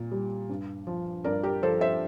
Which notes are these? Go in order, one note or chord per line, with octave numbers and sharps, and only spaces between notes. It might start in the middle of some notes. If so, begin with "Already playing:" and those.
Already playing: A#2
G3
G2
F3
G2 A#4 D5
G4 A#4
F3 A4 C5
C5 E5